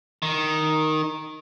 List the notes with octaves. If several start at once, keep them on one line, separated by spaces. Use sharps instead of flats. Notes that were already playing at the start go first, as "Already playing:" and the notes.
D#3